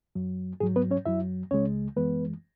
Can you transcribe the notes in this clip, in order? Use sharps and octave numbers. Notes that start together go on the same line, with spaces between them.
F#2 F#3
G#2 F#3 G#4
B3 B4
C#4 C#5
F#2 F#3 E4 E5
C#2 C#3 G#3 C#4 C#5
F#2 E3 G#3 B3 B4